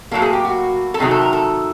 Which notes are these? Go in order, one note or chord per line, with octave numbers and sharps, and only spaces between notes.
A2 F#3 A#3 A4
G#4
G4
F#4
A4
C3 D#3 F#3 A3 G#4
A4
A#4
A4